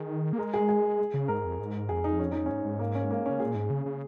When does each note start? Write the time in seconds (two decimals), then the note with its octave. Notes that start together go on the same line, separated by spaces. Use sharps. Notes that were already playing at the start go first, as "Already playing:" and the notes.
Already playing: D#3 G#4
0.33 A#3
0.38 G#3 A#4
0.54 G#4
0.69 G#4
1.14 C#3
1.28 G#2 A#4
1.44 F2
1.59 G#2
1.89 F2 G#4
2.04 D#4
2.19 C#4
2.32 D#4
2.46 G#2 C#4
2.65 G#2
2.79 A#3
2.95 C#4
3.11 A#3
3.26 C#3 C#4
3.40 A#2 G#4
3.55 G#2
3.70 C#3
3.86 C#3